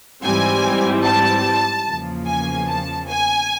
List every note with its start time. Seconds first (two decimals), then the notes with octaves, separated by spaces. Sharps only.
0.23 G#2 E3 G3 C4 E4 G#5
1.04 A5
1.87 E2 C#3 F3 A#3
2.27 G#5
2.68 A5
3.08 G#5